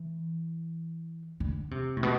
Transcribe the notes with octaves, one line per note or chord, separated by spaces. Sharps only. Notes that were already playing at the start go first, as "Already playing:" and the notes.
Already playing: E3
D3
C3
A2
B2